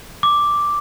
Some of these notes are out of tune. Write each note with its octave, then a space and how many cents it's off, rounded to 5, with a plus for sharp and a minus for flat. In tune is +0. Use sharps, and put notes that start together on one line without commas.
D6 +0